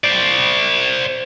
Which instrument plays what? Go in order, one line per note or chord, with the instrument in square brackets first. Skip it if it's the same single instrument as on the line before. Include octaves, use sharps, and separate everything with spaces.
[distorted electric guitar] C5 D5